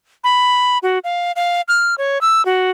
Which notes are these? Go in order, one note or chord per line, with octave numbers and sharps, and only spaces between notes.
B5
F#4
F5
F5
F6
C#5
E6
F#4